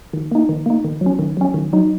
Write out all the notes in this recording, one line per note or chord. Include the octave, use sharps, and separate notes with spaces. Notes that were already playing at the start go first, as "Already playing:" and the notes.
D#3
A#3 D#4
D#3
A#3 D#4
D#3
F#3
C#4
D#3
F#3 C#4
D#3
F#3 D#4